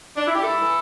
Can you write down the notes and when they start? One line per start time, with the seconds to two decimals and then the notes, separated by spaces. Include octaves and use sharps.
0.17 D4
0.26 E4
0.35 G4
0.43 G2 E4 A4
0.60 E3